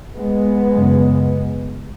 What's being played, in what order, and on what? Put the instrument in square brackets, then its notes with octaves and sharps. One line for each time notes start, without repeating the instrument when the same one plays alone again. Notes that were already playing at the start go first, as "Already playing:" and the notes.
[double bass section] G#3 B3
F#2 C#3